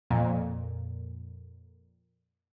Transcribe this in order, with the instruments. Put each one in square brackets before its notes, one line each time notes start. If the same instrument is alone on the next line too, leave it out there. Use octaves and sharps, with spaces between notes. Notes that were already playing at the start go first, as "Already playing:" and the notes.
[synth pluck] F2 A#2